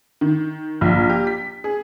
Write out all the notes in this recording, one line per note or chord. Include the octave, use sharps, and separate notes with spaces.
D#3
A#1
G4
B6
G#4